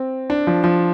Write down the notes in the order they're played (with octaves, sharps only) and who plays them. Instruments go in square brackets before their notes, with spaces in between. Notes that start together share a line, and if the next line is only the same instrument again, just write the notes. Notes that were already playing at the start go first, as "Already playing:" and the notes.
Already playing: [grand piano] C4
D4
F3
F3